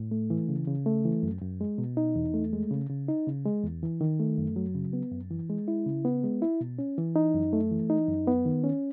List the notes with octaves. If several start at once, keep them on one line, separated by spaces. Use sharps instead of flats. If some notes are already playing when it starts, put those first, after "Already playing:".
Already playing: A2
A3
E3
C#3
C#3
A3
E3
F#2
F#2
G#3
B2
D#4
E2
A3
G#3
C#3
C#3
D#4
C#3
G#3
E2
E3
D#3
A3
F#2
F#3
C#3
B3
F#2
E3
G#3
E4
C#3
B3
G#3
E4
B2
C#4
E3
D#4
F#2
A3
E3
D#4
F#2
B3
D#3
C#4